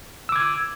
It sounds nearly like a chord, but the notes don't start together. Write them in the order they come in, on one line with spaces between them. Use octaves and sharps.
E6 D6 G#6